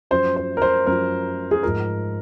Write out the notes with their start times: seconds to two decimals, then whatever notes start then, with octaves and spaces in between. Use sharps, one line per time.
0.11 F#2 F3 C5
0.36 C5
0.57 A#4
0.62 C5
0.87 F#2 F3 A#4
1.51 G#4
1.63 G#2 F3 A#4